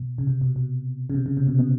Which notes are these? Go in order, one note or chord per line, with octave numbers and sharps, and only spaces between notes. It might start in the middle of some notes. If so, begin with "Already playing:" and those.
Already playing: B2
C#3
C3
B2
B2
C#3
C3
C#3
C3
B2
B2